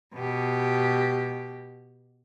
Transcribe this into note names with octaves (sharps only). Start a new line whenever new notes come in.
B2 G4